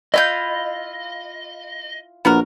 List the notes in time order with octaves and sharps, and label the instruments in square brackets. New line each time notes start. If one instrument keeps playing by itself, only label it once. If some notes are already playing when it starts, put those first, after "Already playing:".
[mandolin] E4 F4 G6 [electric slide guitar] D#5
[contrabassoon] A#1 [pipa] B3 F#4 A#4